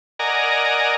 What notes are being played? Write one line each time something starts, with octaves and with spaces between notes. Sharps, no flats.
A#4 D5 D#5 F#5 G#5 A#5